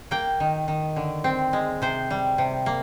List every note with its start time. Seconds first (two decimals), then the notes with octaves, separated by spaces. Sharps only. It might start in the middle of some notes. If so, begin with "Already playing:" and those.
0.11 A#3 G5
0.40 D#3
0.68 D#3
0.96 D3
1.24 C4
1.53 G#3
1.82 C3 C5
2.10 G3
2.38 C3
2.66 A#3